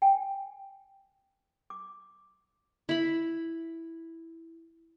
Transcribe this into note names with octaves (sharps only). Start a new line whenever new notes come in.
G5 G#5
D6
E4 B5